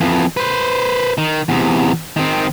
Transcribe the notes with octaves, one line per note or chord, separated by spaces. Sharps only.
F2 E3
B4 C5
D#3
E2 C3
D#3 C4